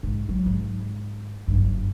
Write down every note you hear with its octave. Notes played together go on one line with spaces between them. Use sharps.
G#2
F#3
G#2
F#1 G2